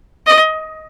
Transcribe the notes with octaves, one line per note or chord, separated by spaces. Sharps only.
D#5